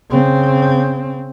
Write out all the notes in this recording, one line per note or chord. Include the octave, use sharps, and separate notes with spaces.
C#3 C4